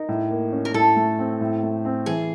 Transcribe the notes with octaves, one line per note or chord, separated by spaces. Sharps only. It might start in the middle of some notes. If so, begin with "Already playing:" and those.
Already playing: D#4 A#4
A2
A#3
C#4
A#4
A2 A4
A3
C4
A2
A3
C4
E3 G#4